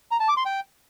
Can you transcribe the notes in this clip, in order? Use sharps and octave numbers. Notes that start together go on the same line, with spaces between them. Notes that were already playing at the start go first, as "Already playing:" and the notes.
A#5
A5
D6
C6
G5